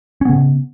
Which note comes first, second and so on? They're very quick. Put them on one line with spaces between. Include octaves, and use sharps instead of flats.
C#4 B3 C#3